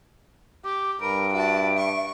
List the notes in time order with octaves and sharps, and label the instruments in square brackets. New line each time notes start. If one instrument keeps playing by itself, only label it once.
[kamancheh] G4 [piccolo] D6
[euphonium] G2 [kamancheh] A#4 [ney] B5 [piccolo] D7
[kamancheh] F#4 A5 [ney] E5
[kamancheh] C#6